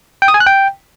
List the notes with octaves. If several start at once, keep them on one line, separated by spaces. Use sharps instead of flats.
G5
D#6
G#5
F#6
G5